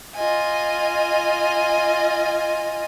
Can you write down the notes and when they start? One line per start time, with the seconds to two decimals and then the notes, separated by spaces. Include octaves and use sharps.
0.15 F4 D#5 G#5